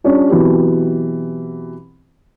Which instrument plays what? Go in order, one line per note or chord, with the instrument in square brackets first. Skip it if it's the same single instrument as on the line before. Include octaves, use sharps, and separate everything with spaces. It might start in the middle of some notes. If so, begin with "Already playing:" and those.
[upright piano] G3 C#4 D4 F4
B2 E3 F#3 C4 G4